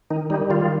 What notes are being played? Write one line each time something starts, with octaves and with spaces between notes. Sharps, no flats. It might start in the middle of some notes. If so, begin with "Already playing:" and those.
D#3 D#4
G3 D#4
D#3 F4